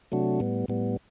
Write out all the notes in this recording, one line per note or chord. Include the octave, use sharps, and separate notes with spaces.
C3 F#3 A3 D4 F#4
A2 G3 B3
A2 G3 B3